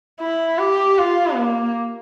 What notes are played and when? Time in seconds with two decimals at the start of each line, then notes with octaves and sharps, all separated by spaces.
0.20 E4
0.58 G4
0.98 F4
1.36 A#3